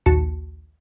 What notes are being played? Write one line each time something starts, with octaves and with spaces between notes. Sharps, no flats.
A#1 D#2 F#4 A5 C#7